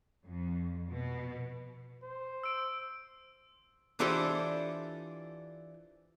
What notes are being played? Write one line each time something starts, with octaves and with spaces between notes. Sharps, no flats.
F2
B2
C5
E6 D7
E3 D4 F4 G4 A4 C5